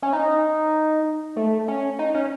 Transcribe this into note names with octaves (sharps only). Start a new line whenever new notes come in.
C#4
D#4
A3
C#4
D#4
C#4